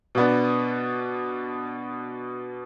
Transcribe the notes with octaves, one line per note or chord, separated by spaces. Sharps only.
B2 B3 D4